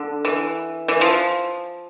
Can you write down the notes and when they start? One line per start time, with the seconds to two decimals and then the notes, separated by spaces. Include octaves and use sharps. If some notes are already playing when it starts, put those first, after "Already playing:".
Already playing: D3
0.25 E3
0.88 E3
1.01 F3